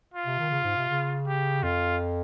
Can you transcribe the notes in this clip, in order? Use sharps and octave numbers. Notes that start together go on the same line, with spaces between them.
F4
C3
D#3
C#3
G#2
C3
C#3
G4
F2 F4